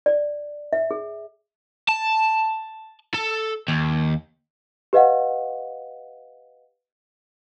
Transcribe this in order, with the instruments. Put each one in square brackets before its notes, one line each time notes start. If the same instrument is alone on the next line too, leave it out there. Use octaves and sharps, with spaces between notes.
[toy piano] D5
E5
G#4
[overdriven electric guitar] A5
A4
D#2
[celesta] G4 B4 D#5 F5 F#5